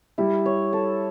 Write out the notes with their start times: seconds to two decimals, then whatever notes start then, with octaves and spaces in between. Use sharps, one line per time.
0.18 G3 E4
0.46 C#5
0.73 A4